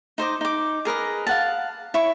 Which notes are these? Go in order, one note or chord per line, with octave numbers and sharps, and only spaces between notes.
D#4 C5 D#5 D6
D#4 D6
G#4 A#4 B4 D#5
F5 F#5 A5
E4 C#5 C#6